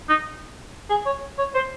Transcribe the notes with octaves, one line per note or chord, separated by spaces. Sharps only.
D#4
G#4
C#5
C#5
C5